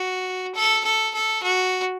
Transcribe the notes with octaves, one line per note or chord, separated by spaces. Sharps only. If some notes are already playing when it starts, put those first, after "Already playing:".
Already playing: F#4
A4
A4
A4
F#4